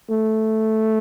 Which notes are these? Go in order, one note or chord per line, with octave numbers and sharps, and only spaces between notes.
A3